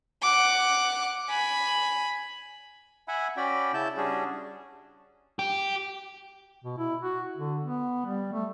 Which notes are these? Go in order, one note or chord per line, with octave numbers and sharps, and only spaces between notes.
F#5 D6
G#5 B5
E5 F#5 G#5 B5
C#4 F#4 D5 G5 B5
C#3 E4 A5 G6
G3 C#4 D4 F#4 G#4
G4
B2
E4
F#4
D3
B3
G3
A3